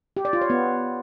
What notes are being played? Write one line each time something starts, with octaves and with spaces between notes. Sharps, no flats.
G4
D5
F4
C#5
B3